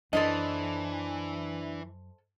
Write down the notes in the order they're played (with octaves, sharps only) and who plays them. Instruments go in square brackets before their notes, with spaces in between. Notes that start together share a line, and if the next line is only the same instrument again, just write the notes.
[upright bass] F#2 [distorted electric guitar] E3 [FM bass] D4 [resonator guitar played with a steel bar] A4 C5 D#5